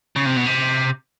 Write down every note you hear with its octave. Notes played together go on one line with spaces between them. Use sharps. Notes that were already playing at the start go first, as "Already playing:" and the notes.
C#3
C3
B2
C3